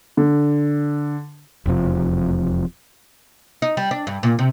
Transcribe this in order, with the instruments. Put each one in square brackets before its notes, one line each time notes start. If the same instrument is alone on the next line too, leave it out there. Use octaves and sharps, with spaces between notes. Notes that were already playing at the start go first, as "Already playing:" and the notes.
[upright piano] D3
[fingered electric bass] E1 F2 C3 F3
[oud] D#4
G3
D4
G2
A#2
C3